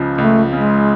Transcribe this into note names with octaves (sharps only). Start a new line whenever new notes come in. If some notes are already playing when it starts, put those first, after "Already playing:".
Already playing: C#2 C#3 F3
C#2 A3
C#3 G#3